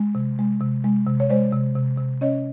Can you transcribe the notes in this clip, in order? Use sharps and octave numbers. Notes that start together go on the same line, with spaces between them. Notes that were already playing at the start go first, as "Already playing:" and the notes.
Already playing: G#3
C3
G#3
C3
G#3
C3
C#5
G#3 C5 D5
C3
C3
C3
C#4 C#5 D#5